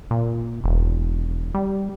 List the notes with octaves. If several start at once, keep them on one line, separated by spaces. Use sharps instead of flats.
A#2
E1
G3